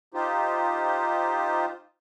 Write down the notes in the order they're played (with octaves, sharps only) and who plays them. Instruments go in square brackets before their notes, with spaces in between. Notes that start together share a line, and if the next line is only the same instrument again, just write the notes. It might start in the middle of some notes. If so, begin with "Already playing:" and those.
[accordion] D#4 F4 G4 C5